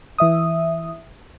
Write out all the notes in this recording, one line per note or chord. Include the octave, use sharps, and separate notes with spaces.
E3 E5 D#6